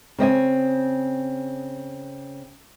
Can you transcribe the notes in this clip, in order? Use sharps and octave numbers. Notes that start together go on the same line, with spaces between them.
C#3 C4 D#5 G#5